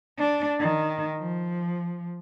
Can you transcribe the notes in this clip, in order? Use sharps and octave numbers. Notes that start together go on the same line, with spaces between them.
D4
D#3
F3